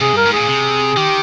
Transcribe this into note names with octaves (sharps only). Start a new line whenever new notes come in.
C3 G#4
G2 A#4
G#2
A#2 G#4
C3
D#3 G4